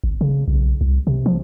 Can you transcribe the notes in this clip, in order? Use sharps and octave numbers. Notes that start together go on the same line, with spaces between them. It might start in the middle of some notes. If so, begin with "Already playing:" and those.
G#1
C#3
B1
C2
C3
F3